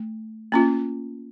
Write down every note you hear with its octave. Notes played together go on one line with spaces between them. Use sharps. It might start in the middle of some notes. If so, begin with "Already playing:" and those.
Already playing: A3
A#3 C#4 F4